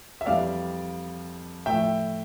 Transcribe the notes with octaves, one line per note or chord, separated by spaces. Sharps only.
E5
F2 E3 G3 D5 F5
A2 F3 A3 E5 G5